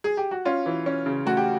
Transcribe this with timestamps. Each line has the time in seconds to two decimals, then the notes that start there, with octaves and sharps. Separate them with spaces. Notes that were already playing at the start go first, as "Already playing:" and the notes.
0.04 G#4
0.17 G4
0.31 F#4
0.45 C#4 F4
0.66 E3
0.86 C#4
1.06 C#3
1.26 A3 F#4
1.37 G4